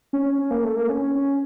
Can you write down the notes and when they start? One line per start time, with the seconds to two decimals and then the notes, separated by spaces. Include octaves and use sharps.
0.13 C#4
0.26 C#4
0.38 C#4
0.51 A#3
0.64 A3
0.76 A#3
0.89 C#4
1.01 C#4
1.15 C#4